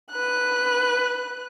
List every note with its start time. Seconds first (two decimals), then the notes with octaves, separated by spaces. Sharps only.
0.11 B4 F#6